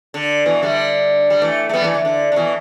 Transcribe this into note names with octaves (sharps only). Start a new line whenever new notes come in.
D3
B2 E3
D3 G3
G3
E3 A3
A3
G3 B3
E3 A3
D3
D3
D3
B2 E3